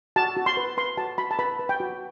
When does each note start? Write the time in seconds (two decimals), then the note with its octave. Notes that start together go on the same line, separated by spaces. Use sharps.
0.16 F#4 A5
0.37 F#4
0.46 C6
0.57 B4
0.77 B4 C6
0.97 F#4 A5
1.18 F#4 B5
1.31 A5
1.39 B4 B5
1.59 B4
1.69 G5
1.80 F#4